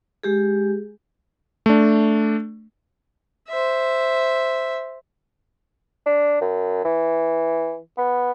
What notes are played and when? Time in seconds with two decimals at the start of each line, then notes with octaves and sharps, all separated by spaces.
0.23 G#3 G4 G#4
1.66 A3 D4
3.48 C5 E5
6.06 D4
6.41 F#2
6.85 E3
7.98 B3